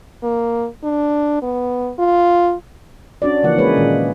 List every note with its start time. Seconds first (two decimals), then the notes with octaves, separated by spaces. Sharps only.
0.23 A#3
0.84 D4
1.42 B3
1.99 F4
3.22 C#4 D4 F#4 D5
3.43 C#3 E3 F3 A#3 F#5
3.58 G#3 A#3 C#4 G#4 B4 C#5
3.76 A#2 D#3 G#3